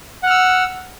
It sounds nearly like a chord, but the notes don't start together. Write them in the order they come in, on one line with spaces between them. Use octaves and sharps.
F#5 F6 E6